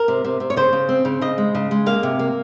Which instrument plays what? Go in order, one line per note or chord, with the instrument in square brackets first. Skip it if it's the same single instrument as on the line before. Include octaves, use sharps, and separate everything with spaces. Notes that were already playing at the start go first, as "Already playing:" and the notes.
Already playing: [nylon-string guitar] A#4
C3
C3
C3
C#5
C#3 C5
C#3
C4
C#3
C#3 D#5
G#3
C#3
G#3
A#3 F5
C3
A#3